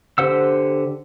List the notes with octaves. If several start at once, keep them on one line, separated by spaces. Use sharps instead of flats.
D3 G4 C5 F#5 E6